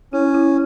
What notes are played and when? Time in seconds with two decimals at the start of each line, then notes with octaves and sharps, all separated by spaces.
0.13 C#4 E4
0.34 E4